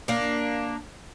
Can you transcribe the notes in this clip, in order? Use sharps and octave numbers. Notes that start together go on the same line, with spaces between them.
A#3 D4